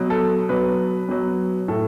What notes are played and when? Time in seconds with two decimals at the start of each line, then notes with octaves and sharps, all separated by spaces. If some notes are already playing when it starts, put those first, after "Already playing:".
Already playing: B2 F#3
0.10 A4
0.49 B2 F#3 B4
1.09 B2 F#3
1.68 A2 A4